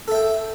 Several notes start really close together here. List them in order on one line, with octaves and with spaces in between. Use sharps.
A4 E5 G5